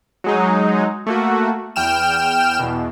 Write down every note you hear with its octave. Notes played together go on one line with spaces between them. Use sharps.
F#3 G#3 D#4
A3 A#3 F#4
E2 G5 F6 E7
E2 B2